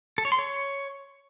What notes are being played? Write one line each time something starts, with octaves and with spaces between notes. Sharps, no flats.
A4
C#5
C6
C#5